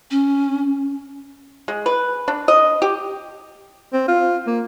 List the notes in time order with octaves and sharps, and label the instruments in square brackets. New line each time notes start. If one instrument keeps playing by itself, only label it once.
[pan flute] C#4
[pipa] G#3
B4
D4
D#5
G4
[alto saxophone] C4
F4
A#3